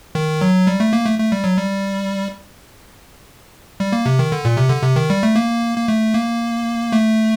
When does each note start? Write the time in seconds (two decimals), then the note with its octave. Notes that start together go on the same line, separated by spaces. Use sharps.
0.15 D#3
0.41 F#3
0.67 G3
0.80 A3
0.93 A#3
1.06 A3
1.19 A3
1.32 G3
1.44 F#3
1.58 G3
3.80 G3
3.92 A#3
4.06 C3
4.19 D#3
4.32 D3
4.45 A#2
4.57 C3
4.70 D3
4.83 C3
4.96 D#3
5.10 G3
5.23 A3
5.36 A#3
5.78 A#3
5.88 A3
6.14 A#3
6.92 A3